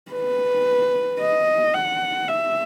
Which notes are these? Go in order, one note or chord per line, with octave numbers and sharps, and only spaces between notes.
B4
D#5
F#5
E5